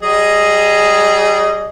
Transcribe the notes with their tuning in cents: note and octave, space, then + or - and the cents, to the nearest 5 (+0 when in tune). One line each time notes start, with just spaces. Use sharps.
G3 -30 G#4 +0 D#5 +0